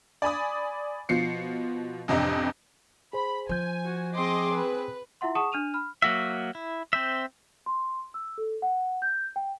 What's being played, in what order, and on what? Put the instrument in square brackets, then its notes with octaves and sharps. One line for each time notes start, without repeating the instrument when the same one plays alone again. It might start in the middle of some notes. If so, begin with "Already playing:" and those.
[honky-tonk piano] D5 G#5 B5 D#6
B2 F3 C7 C#7
A1 F2 C3 D4 D#5 A#5
[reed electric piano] G#4 C5 [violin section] B5
[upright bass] F3 [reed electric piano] C5 G6 [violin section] G#5
[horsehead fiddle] F#4
[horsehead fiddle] C4 G#4 [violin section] D#5 C6 D6
[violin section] B4
[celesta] E4 F4 E5 F#5 C6
G#4 F#5 A5 C#6 D#6 E7
D4 F6 D#7 F7
B5 F6
[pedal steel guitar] F#3 A#3 F#4 E5
E4
C4 C5 E5
[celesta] C6
E6
A4
F#5
G6
G5